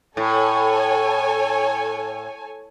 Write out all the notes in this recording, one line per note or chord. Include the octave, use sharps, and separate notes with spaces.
A2 A4 C#5 G#5